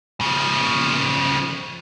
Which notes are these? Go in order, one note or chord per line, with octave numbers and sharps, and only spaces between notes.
C#3 F3